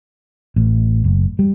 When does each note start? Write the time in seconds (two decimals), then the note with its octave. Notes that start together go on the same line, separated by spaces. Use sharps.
0.56 A1
1.04 F#1
1.39 G3